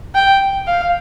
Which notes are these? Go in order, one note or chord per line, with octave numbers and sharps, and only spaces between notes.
G5
F5